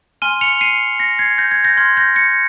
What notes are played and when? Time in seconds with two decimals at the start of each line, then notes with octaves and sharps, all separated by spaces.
0.22 G#5 C6 F6 D#7 G7
0.41 C#7 F7
0.61 C7 D#7
1.00 A#6 C#7
1.19 G#6 C7
1.38 G6 A#6
1.51 G#6
1.65 G6 A#6
1.77 C6 F6 G#6
1.97 G6 A#6
2.16 A#6 C#7